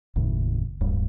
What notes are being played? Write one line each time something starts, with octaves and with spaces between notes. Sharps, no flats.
F#1 D#2 A2 C#3
D1 G2